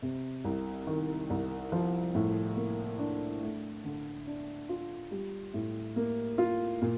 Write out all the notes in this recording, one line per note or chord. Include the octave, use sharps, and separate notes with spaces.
C3
C2
D#3
C2
F3
A2
A#3
D4
A3
D3
D4
F4
G3
A2
A#3
F4
A#2